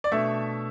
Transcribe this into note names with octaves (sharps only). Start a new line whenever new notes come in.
D5
B2 A3 D4 E5